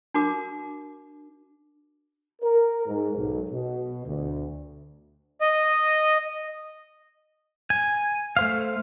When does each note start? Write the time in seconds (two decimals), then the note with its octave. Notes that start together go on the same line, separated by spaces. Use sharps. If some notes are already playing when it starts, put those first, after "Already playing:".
0.14 D4 F#4 A#4 D6
2.42 A#4
2.86 G#2
3.17 B1
3.50 B2
4.05 D2
5.41 D#5
7.70 G#5
8.37 A3 C5 F5